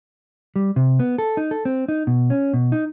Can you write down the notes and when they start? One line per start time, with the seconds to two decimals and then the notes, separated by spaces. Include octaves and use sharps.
0.56 G3
0.76 C3
0.99 B3
1.18 A4
1.37 D#4
1.51 A4
1.65 C4
1.88 D#4
2.07 B2
2.30 C#4
2.53 B2
2.72 D#4